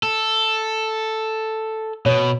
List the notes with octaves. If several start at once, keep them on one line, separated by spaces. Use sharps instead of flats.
A4
B2 C#5